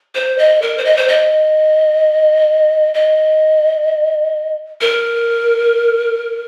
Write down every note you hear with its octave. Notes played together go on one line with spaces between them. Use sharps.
C5
D#5
A#4
C5
D#5
C5
D#5
D#5
A#4